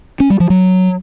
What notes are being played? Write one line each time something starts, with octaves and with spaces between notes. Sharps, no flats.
C#4
G3
F3
F#3